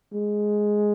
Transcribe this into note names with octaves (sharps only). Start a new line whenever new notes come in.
G#3